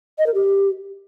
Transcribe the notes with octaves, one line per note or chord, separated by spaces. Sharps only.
D#5
A#4
G4